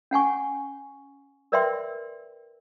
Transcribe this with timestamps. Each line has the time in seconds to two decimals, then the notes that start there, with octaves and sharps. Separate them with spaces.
0.11 C#4 F#5 G#5 C#6
1.52 A#4 B4 D5 E5 G5 C6